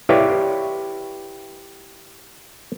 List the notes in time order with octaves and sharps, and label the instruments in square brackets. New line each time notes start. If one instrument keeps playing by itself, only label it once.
[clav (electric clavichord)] E4 G4 B4 C#5 D5 F5